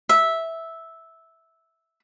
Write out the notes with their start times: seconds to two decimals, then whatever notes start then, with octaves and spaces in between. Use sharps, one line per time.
0.09 E5